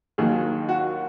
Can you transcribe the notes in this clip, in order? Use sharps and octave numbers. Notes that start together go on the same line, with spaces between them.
D#2 D#3 F#3 G#4
F#4